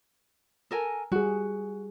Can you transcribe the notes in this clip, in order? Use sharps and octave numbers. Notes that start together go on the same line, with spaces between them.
A4 A#4 G#5
G3 F#4 G#4